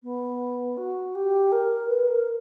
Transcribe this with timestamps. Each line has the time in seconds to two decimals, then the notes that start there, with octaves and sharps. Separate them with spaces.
0.03 B3
0.77 F#4
1.15 G4
1.52 A#4
1.88 B4
2.07 A#4